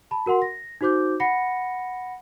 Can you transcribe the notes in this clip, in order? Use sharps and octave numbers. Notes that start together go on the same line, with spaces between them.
A5 B5
F#4 A#4 F#5 C6
A#6
D#4 F#4 C5 D6 G6
F#5 B5 A#6 C#7